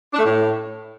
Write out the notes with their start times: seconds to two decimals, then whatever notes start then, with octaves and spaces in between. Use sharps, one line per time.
0.13 D4
0.19 A3
0.24 A2